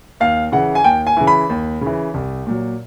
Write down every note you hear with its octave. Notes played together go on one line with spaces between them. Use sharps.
D#2 F5
C#3 E3 F#5
G#5
D#2 G5
G#5
C#3 E3
B5
D#2
C#3 E3
C2
A#2 F#3